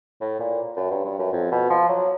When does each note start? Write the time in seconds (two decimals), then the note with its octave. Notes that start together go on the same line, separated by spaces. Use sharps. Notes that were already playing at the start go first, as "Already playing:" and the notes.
0.21 A2
0.40 A#2
0.76 F#2
0.91 G2
1.05 G2
1.19 F#2
1.33 F2
1.52 B2
1.70 F3
1.89 F#3